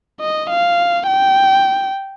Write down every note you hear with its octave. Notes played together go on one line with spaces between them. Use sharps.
D#5
F5
G5